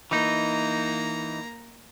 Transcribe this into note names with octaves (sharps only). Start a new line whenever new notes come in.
E3 A#3 D#4 A#5